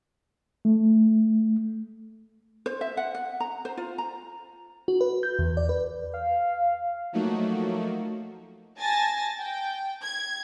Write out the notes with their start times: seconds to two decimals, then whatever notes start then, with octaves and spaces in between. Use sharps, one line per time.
0.65 A3
2.66 C5
2.81 E5
2.97 F#5
3.15 F#5
3.40 A#5
3.65 C5
3.77 F4
3.98 A#5
4.88 F#4
5.01 B4
5.23 G6
5.39 E2
5.57 D5
5.69 B4
6.14 F5
7.13 F3 F#3 A3 A#3 D#4 F#4
8.78 G#5 A5 A6 A#6
9.39 G5
10.02 G#6